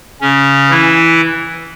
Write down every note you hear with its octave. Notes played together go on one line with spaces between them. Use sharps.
C#3 C#4
E3 E4